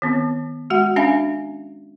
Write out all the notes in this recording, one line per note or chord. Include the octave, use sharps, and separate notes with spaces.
D#3 B3 C4
G#3 F#4 F#5
C#4 D4 E5 F5 G#5